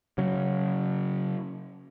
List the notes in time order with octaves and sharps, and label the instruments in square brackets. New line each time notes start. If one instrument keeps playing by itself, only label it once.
[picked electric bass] C#3 F#3